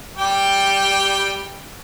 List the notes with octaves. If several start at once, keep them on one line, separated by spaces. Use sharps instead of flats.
G3 G4 G5